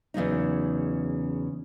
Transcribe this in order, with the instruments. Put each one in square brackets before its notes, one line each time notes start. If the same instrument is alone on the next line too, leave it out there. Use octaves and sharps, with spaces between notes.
[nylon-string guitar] E2 C#3 F#3 D#4